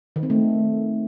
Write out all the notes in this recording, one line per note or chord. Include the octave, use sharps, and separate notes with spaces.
D#3
C4
A3